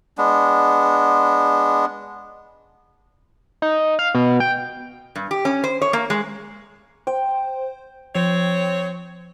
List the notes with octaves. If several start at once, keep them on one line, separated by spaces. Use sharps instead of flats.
G#3 B3 D4
D#4
F5
B2
G5
G2
G4
C#4
C5
C#5
A#3
G#3
C5 G5
F3 C4 C#5